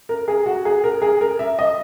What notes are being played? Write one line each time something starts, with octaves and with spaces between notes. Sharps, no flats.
A#4
G#4
F#4
G#4
A#4
G#4
A#4
E5
D#5